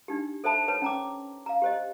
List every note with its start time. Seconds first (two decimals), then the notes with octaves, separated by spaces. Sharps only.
0.08 D4 D#4 G4
0.44 A4 C5 E5 A5 B5
0.68 B4 C#5 A5
0.82 C#4 A#5 D6
1.46 F5 A#5
1.62 G4 C5 D#5